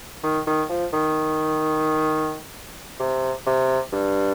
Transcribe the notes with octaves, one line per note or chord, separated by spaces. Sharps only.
D#3
D#3
F3
D#3
C3
C3
G2